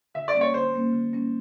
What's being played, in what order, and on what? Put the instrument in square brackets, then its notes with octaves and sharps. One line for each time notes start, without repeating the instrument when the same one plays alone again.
[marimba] D3 [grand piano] E5
[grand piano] D5
[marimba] G3 A#3 C#4
[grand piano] C#5
[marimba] D3 [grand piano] C5
[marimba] G3 A#3 C#4
D3
G3 A#3 C#4